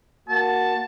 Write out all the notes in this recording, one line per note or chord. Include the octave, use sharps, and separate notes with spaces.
A#3 F#4 A5